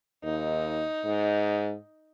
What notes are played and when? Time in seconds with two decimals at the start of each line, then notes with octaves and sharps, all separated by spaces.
0.24 D#2 D#4
1.05 G#2